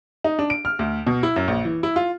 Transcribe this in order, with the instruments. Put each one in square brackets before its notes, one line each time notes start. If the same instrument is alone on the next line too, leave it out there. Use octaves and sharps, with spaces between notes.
[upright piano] D#4
D4
D7
F6
D2
B2
E4
F#2
A#1
E3
E4
F4